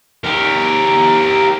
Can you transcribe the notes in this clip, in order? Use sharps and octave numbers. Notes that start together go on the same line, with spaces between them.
G4 A#4